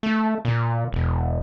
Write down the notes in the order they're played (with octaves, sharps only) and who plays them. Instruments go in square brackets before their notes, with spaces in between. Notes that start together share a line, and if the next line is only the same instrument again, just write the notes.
[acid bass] A3
A#2
E1